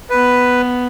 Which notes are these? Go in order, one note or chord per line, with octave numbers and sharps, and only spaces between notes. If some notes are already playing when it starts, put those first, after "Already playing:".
B3 B4